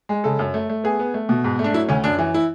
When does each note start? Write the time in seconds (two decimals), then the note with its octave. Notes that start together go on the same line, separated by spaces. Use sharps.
0.09 G#3
0.24 C#3 A4
0.39 F#2
0.54 A3
0.69 A3
0.84 B3 G#4
0.99 B3
1.14 A3
1.29 B2
1.44 G#2
1.59 A3
1.64 D4
1.74 F#3 E4
1.89 D2 C#4
2.04 F#2 D4
2.18 E3
2.34 E4